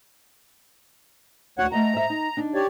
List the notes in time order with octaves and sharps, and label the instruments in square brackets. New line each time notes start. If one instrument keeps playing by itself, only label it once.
[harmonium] D2 C#5 F#5 [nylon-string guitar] F#4
[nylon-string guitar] A3 D#5 F#5 [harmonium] A#5
[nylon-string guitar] G#2 E5
D#4
D4 D#4
[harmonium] G4 C#5 D5